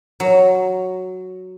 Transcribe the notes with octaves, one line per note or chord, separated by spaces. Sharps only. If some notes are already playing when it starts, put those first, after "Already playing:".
F#3